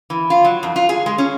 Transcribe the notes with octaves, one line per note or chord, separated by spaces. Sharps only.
E3
F4
F#3
F2
F4
G#4
G#3
C#4